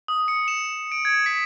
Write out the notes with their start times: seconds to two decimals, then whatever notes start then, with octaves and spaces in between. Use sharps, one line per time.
0.08 D#6
0.28 C#7
0.48 E7
0.92 D7
1.05 G#6
1.26 B6